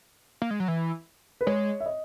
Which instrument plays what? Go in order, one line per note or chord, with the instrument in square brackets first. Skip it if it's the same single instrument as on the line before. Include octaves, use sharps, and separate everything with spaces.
[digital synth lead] A#3
G#3
F#3
E3
[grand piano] B4
[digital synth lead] G#3 [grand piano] C#5
[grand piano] E5
D#5